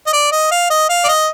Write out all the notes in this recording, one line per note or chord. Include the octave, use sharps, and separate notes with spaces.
D#5
D5
D#5
F5
D#5
F5
D5
D#5